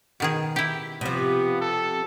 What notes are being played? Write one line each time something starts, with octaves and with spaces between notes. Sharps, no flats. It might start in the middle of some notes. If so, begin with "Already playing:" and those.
B2 D#3 G#4
E4 G4
C3 F3 B3
A4